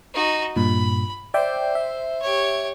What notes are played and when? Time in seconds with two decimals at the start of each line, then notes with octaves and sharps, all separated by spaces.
0.14 D#4 F#4
0.56 G2 A#2 B5
1.34 C5 D5 E5 G5
1.75 E5
2.22 G4 C#5